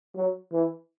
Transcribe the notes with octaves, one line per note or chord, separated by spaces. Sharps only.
F#3
E3